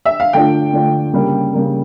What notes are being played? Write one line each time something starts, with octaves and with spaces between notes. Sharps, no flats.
E5
F5
D3 A3 D4 F4 G5
D3 A3 D4 F4
C#3 G3 A#3
C#3 G3 A#3